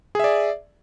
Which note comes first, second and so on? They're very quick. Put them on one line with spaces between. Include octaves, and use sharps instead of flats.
G#4 E5 D5